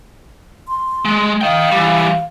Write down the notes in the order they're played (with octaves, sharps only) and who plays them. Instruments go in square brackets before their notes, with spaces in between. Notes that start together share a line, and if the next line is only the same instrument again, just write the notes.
[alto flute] C6
[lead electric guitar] G#3
[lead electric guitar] D#5 G5 [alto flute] F5
[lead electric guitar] E3 G3